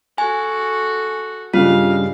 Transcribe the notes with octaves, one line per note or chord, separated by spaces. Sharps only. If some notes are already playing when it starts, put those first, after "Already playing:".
F#4 A4 G#5
G2 C#3 G#3 F4 F5